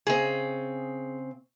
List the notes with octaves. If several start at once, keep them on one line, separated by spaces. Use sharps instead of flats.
C#3 C4 G#4 D#5